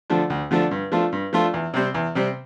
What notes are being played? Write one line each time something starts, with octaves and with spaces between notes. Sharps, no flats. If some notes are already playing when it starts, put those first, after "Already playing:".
D3 F3 A3 D4
D2
D3 F3 A3 D4
G2
F3 A3 D4 F4
G2
F3 A3 D4 F4
E2
C3 G3 C4
E2
C3 G3 C4